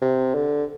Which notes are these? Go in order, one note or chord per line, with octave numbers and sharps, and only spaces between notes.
C3
D3